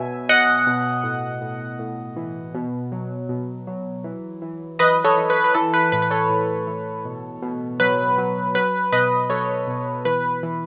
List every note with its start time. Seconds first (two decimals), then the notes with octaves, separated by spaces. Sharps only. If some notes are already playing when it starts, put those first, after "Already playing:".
Already playing: B2 F#3 E5 G#5
0.29 B2 D#5 F#5
0.67 B2
1.04 A2
1.41 A2
1.79 A2
2.17 E3
2.55 B2
2.92 F#3
3.29 B2
3.67 F#3
4.04 E3
4.42 E3
4.79 E3 B4 D#5
5.04 A4 C#5
5.18 E3
5.30 B4
5.44 B4
5.54 E3 A4
5.74 B4
5.92 A2 B4
6.02 B4
6.10 A4 C#5
6.29 A2
6.67 E3
7.05 B2
7.42 B2
7.80 F#3 B4
8.18 F#3
8.55 F#3 B4
8.92 B2 B4 D#5
9.30 F#3 A4 C#5
9.67 B2
10.05 E3 B4
10.43 E3